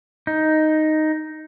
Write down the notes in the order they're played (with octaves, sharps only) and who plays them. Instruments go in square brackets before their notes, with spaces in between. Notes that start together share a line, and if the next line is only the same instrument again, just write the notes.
[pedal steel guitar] D#4